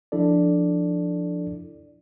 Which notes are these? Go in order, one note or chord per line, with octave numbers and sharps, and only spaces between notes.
F3 D4 E4 A4 D5